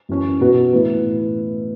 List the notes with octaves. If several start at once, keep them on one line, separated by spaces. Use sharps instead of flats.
F#2 E3 C#4
B2 B3 F#4 B4
A2 E3 B3 E4 B4